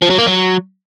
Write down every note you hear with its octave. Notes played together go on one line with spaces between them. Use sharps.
F3
F#3
A#3
F#3